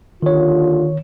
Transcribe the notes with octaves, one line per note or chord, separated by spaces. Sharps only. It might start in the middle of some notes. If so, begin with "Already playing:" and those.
D#2 D3 D#3 F4 C#5